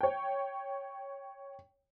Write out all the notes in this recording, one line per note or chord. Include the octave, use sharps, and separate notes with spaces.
C#5 G5